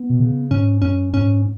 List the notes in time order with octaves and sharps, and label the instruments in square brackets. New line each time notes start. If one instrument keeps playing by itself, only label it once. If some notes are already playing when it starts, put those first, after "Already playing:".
Already playing: [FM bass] B3
[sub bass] B2
C#3
[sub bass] G#2 [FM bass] C#4
[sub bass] F#2 [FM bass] C#4
[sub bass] G#2 [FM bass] C#4